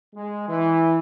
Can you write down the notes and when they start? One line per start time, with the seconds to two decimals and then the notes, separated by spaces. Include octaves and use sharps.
0.15 G#3
0.49 E3